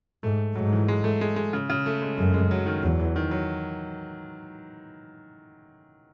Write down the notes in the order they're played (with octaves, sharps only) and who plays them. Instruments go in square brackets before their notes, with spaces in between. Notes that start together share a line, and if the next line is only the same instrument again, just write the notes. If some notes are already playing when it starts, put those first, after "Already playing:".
[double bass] G#2 [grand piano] A3
[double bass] G#2 [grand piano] F#3
[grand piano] E3
G#3
A3
G#3
G#3
C#3
C#3
A3
G#3
[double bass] F#2 [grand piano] G#3
[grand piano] G#3
F#3
D#3
[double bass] E2 [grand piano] F#3
[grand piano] E3
D#3
F#3